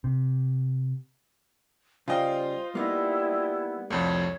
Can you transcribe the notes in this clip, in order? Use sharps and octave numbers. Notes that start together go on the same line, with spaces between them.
C3
C#3 G3 F4 C5 D#5 F5 G5
G3 A#3 B3 D#4 E4
C2 F2 F3 A3 A4 C#5